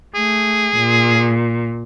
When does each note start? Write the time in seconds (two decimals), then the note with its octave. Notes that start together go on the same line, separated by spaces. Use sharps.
0.15 A3 G#4
0.76 A#2